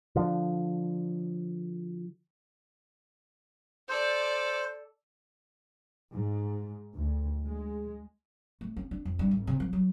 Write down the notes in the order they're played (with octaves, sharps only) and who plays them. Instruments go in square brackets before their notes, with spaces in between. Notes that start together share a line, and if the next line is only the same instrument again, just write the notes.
[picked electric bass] D3 F3
[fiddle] A4 D5 [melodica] C5
[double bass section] G#2
D2
G#3
[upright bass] A3
C#4
D4
F2
G2
G#1
C3
F3
F#3